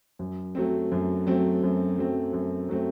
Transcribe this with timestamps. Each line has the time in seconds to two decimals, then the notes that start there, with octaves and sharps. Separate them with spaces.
0.19 F#2
0.55 F#3 A3 C4
0.92 F#2
1.27 F#3 A3 C4
1.63 F#2
1.98 F#3 A3 C4
2.33 F#2
2.69 F#3 A3 C4